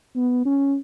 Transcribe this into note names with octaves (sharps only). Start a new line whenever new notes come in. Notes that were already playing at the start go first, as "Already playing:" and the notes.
B3
C#4